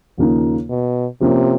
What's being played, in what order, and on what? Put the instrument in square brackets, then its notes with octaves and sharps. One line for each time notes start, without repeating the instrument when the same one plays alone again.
[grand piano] D#2 C#3 F3 A#3 D#4
[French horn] B2
[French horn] C3 [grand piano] F3 A#3 C#4